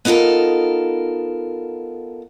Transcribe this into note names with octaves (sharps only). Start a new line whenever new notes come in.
B3 D#4 F4 A4 A#4